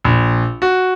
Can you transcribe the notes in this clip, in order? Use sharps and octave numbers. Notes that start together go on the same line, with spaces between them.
A#1
F#4